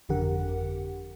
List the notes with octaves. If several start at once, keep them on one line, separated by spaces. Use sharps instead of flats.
G1 F2 D3 G4 A#4 F#5